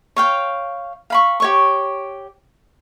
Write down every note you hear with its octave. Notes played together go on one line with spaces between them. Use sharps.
C#5 F5 G5
F5 B5 C#6
G4 C#5 C#6